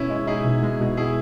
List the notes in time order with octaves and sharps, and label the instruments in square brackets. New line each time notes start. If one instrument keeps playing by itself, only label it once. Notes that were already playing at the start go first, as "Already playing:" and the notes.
Already playing: [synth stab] B2 [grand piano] C#4 E4
[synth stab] G#3
[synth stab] D#4 [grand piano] E4 G#4
[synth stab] B2
G#3
B2
[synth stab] B2 [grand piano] E4 G#4